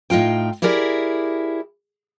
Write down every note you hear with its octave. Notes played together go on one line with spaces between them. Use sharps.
A2 D#4 F4 G5
E4 G4 G#4 A#4 D5